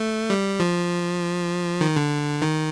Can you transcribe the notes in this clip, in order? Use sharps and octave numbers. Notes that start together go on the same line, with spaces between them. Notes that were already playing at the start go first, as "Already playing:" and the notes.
Already playing: A3
G3
F3
D#3
D3
D#3